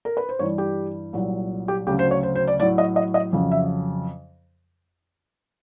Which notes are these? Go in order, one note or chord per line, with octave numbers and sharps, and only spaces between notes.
A#4
B4
C5
G2 E3 G3 C#5
G4
C2 A#2 F#3
G4
D2 C#3 F#3 G4
C5
C#5
C5
C5
D5
A2 F#3 D5
D#5
D#5
D#5
F2 C#3 F#3
E5